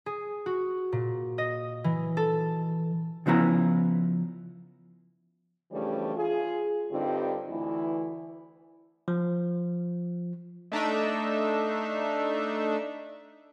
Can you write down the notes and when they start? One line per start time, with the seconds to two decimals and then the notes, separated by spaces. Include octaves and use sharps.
0.06 G#4
0.46 F#4
0.92 A#2
1.38 D#5
1.84 E3
2.17 A4
3.26 C#3 F3 B3 E4 A#5
5.72 C#3 E3 F3 G3 A3 D4
6.16 F4 G#4
6.91 G2 D3 G3 C4 D#4 F4
7.49 D2 E3 E4
9.08 F3
10.72 A3 D4 D#4 E5